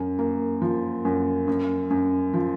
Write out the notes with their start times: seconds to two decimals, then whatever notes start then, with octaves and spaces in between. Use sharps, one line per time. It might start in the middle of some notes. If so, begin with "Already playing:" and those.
Already playing: F#2
0.19 A#3
0.62 F3
1.05 F#2
1.48 F#2
1.91 F#2
2.33 F3